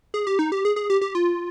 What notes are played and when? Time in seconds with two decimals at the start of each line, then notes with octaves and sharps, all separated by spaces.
0.14 G#4
0.27 G4
0.39 D#4
0.52 G4
0.65 G#4
0.76 G#4
0.90 G4
1.01 G4
1.15 F4